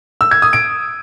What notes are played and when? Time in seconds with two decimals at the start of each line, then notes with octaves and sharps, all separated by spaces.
0.21 E6
0.31 G#6
0.42 D#6
0.53 D7